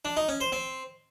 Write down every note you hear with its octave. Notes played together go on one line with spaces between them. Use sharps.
D4
D#4
C#4
C5
C4